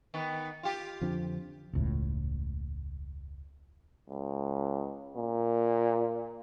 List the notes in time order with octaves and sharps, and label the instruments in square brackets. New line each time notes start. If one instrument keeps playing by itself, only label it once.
[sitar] D#3 B3
F4 G4
[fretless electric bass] F2 D3 F3
E1 C#2 A2
[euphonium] C#2
A#2